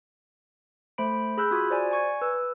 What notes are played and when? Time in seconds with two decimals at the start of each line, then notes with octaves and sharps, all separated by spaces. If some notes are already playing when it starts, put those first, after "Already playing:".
0.98 A3 C5 B5 D7
1.37 G#4 B5 E6 F#6 G6
1.51 F4 F#4 D#6 G#6
1.70 C5 D5 G#5
1.91 G#5 C#6 G#6
2.21 B4 E6